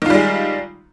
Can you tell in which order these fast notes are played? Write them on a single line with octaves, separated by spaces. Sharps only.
D#3 F4 G3 G#3